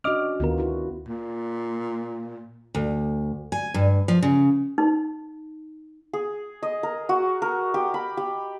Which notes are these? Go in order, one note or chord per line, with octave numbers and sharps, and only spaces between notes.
C#4 D4 F#4 D#5 D6 F6
D2 D#3 B3 F4 A#4
E4 F#4
A#2
D2
G#5
G2
F3
C#3
D#4
G#4
D#5
A#4
F#4
A#4
G4
B5
G4